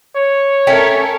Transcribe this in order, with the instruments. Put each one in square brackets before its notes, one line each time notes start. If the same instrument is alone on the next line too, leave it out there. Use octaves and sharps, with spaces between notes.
[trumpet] C#5
[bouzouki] A3 C#4 G5 [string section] A4 A#4